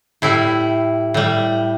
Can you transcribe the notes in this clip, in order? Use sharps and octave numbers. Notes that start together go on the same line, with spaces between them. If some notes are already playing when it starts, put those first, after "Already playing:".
A2 G3 E4
A2 G3